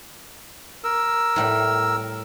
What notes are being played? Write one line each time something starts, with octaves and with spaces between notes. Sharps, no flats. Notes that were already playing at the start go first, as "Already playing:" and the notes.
A#4 E6
A2 G3